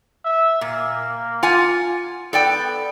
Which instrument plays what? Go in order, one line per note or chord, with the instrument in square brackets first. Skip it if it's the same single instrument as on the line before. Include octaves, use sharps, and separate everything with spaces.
[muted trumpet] E5
[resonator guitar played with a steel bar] A#2 [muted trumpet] A#3
[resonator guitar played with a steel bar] F4 F#5 G#5
[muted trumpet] B3 [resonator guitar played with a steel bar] A4 D5 G5